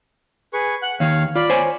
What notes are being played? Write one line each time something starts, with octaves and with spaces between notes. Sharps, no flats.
G#4 B4 C#6
F#5 F#6
D#2 D#3 C#5 F5
F4 D5 B5
C5 C#5 G#5